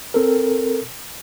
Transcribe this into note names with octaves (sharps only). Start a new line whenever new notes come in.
C4 A4 A#4